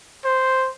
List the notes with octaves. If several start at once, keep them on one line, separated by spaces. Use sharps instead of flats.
C5